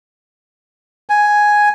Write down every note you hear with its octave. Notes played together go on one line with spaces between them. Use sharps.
G#5